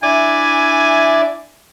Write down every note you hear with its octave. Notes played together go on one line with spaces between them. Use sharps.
D4 E4 D5 E5 G#5